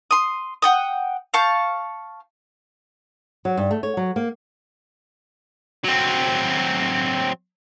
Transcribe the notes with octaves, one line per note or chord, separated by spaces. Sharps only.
C6 D#6
F#5 G5 D#6
F5 A5 C#6 G6
F#3
G2
A3
C#5
F#3
A#3
F#3 C4